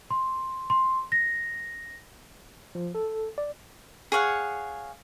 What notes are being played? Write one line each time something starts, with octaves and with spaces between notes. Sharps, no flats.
C6
C6
A#6
F3
A4
D5
G#4 C#5 F5 F#5